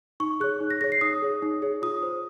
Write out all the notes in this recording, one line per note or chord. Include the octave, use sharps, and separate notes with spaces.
D#4 C#6
G#4 C#5 F#6
D#4
A#6
G#4 C#5 A#6
C7
D#4 D#6
G#4 C#5
D#4
G#4 C#5
F4 D#6
C5